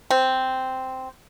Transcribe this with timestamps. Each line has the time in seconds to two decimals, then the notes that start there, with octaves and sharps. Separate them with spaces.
0.11 C4